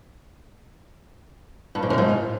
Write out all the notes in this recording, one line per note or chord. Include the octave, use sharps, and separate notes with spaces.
G2
G#2
F#2
G#2